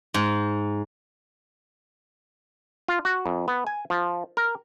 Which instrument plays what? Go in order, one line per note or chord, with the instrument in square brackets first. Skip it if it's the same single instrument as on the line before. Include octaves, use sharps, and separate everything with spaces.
[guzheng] G#2
[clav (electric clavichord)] F4
F#4
F2
B3
G#5
F3
A#4